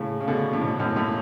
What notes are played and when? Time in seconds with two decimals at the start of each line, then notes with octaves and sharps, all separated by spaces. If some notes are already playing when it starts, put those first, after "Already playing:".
Already playing: A2 C#3
0.21 C#3
0.28 B2 D3
0.53 A2
0.62 G#2 B2
0.79 F#2 A2
0.96 F#2 A2